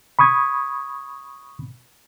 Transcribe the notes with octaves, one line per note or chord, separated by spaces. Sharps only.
B5 C#6 D#6 G#6